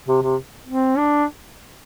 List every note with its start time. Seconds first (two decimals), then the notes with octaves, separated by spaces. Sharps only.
0.08 C3
0.22 C3
0.67 C4
0.98 D4